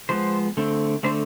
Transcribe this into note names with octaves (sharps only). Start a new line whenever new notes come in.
F3 G#3 B3 C5
D3 A3 C4
D3 A3 C4 C5